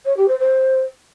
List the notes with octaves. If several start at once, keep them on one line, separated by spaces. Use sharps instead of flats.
C#5
G4
C5
C5